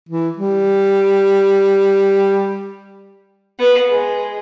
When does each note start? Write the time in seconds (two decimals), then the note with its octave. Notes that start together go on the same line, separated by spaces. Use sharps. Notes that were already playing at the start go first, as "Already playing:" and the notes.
0.09 E3
0.37 G3
3.59 B3
3.89 G#3